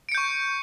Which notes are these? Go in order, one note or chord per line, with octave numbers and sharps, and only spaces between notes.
C#6 G6 C#7 D7